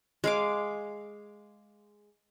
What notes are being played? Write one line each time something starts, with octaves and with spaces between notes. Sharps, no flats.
G#3 F5 D6